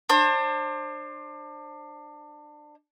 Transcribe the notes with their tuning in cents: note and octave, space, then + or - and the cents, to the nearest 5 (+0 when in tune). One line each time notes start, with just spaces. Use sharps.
D4 +25 C5 +35